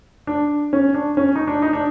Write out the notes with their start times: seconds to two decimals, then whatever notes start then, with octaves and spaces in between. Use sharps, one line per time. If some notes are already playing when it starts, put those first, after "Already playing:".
0.27 D4
0.73 C#4
0.94 D4
1.17 C#4
1.36 D#4
1.47 D4
1.62 D#4
1.73 D4